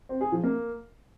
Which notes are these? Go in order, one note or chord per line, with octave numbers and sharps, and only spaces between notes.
C4
G#4
F3
A#3